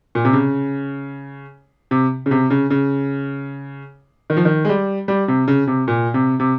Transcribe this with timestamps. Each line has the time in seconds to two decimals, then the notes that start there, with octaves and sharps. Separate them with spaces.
0.15 A#2
0.25 C3
0.33 C#3
1.91 C3
2.26 C#3
2.31 C3
2.50 C#3
2.71 C#3
4.30 D#3
4.37 F3
4.45 D#3
4.65 G#3
4.69 G3
5.08 G3
5.28 C3
5.48 C#3
5.67 C3
5.88 A#2
6.14 C3
6.40 C3